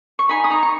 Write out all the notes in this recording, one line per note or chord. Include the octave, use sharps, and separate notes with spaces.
C#6
D#4 G#5 B5
D#6
D#4 A#5 C#6
C#6